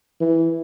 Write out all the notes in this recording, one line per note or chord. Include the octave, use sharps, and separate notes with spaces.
E3